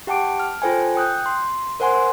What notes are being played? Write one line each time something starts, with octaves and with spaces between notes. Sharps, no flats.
G4 F#5 G5 A5 D6 D7
F6
F4 A4 C5 G5 G#5
G5 D#6 F#6 G6
C6
A#4 C5 F#5 G#5 C6